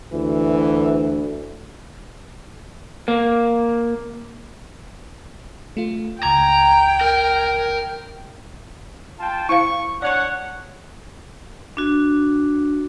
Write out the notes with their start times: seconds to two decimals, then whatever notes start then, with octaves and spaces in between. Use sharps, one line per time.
0.13 D2 E3
3.08 A#3
5.77 A3 F4
6.23 C#2 G5 A#5 G#6
7.01 A#4
9.20 F4 G5 A5
9.49 E4 C5 F5 C#6
10.02 D4 C#5 D5 F#5 C#6
11.77 D4 F#4